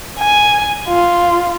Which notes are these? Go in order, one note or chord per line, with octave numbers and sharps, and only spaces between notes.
G#5
F4